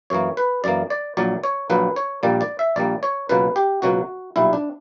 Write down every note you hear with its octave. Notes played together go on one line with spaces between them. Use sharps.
F#2 E3 A#3 C#5
B4
F#2 E3 A#3 D5
D5
A#1 A#2 F#3 A#3 D5
C#5
A#1 A#2 F#3 A#3 B4
C#5
A#1 A#2 G3 A#3 D5
D5
E5
A#1 A#2 G3 A#3 D5
C#5
C#2 B2 F#3 A#3 B4
G4
C#2 B2 F#3 A#3 F#4
B1 A#2 G3 E4
D4